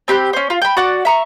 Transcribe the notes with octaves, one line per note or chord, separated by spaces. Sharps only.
C4 G4 B5 F#6
C#4 C5
F4
G5 B5
F#4 D5 F#5
E5 A#5 C#6